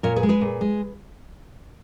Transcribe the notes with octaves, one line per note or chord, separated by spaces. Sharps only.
A#2 A#4 C#5
G#4 B4
G#3
G#4 B4
A#2
G#3